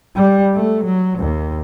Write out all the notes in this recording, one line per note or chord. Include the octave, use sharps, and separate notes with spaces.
G3
A3
F#3
D#2